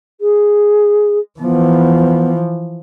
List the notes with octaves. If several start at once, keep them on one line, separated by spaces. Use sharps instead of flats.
G#4
E3 F3 B3